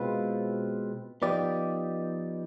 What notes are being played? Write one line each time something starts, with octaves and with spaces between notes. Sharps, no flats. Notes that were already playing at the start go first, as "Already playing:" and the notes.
Already playing: B2 G#3 C4 F4 B4
F3 B3 D#4 G4 D5